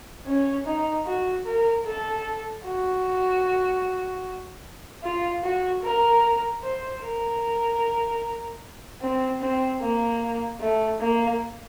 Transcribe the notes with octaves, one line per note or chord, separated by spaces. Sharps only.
C#4
D#4
F#4
A#4
A4
F#4
F4
F#4
A#4
C5
A#4
C4
C4
A#3
A3
A#3